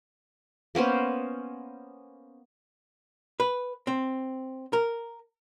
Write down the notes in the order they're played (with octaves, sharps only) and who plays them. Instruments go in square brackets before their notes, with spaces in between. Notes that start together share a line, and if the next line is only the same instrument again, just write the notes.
[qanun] A#3 B3 C#4 C5
[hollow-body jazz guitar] B4
C4
A#4